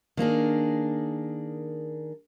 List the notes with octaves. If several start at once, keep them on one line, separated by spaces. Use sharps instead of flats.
D#3 A#3 D4 G#4